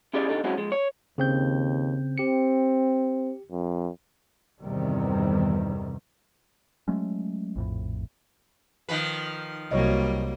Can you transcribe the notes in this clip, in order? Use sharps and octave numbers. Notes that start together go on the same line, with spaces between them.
C#4 E4 G4 G#4 D5
C3 D4 D#4 G4 A4
F#3 G#3 C4 C#4 E4 F#4
F3 G#3
C#5
D#2 C#3 C4 G6
C4 G4 C#7
F2
E2 G2 C3 D#3 G3
F#3 G#3 A3 C#4
A#1 F2 A2
D#3 F3 B4
C2 F#3 G3 A#3 C#5 D#5